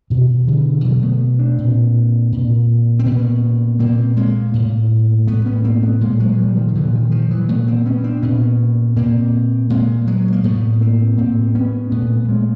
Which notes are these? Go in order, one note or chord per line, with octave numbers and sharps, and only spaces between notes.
B2 D#3
D3 E3
B2 E3 F#3
A3 B3
C4 D4
A#2
A#2
C4
A#2 B3 C#4
A#2 A#3 C4
G#3 A#3
A2
A2 A3 B3
B3 C#4
A#3 C4
A3 B3
A#2 G#3 A#3
F#3 G#3
F3 G3
D#3 F3
D#3
A#2 D3 E3
F#3
D#3 F3
D#3 F3
E3 F#3
A#2 A3 B3
A#3 C4
B3 C#4
C4 D4
A#2 B3 C#4
A#2 A#3 C4
A#2 G#3 A#3
F#3 G#3
A#3
A2 A3 B3
A#3 C4
A2 A#3 C4
B3 C#4
A#2 A3 B3
B3
G#3 A#3